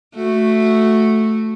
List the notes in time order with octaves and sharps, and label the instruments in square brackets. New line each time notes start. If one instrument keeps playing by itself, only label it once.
[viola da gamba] A3 F#4